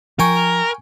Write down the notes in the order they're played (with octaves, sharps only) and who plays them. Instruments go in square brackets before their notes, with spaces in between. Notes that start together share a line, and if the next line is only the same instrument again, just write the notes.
[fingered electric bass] F3 [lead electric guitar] A#4 [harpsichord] G5 G#5 C#6